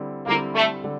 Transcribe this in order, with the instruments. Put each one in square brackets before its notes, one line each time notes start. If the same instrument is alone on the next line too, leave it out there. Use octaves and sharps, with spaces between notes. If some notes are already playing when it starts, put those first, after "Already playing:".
Already playing: [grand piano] D3 G3 C4 E4
[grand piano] D3 G3 C4 E4 [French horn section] A#3
[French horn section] A3
[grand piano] D3 G3